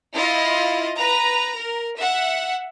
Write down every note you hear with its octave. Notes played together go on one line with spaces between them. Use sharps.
E4 F4 D#5
B4 A#5
A#4
E5 F#5